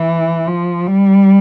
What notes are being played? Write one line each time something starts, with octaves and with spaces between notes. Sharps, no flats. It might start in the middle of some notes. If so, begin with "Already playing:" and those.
Already playing: E3
F3
G3